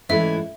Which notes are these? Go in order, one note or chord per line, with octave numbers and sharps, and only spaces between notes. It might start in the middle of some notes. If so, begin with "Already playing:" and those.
G#2 E3 A3 C#4 E4 E5